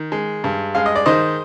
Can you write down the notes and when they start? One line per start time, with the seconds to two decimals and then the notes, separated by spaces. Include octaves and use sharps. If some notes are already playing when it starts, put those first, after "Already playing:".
Already playing: D#3
0.12 G#3
0.44 G2
0.75 G#3 F5
0.86 D#5
0.96 D5
1.06 D#3 C5 D#5